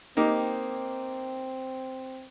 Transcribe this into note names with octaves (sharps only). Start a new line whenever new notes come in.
A#3 C4 D#4 G4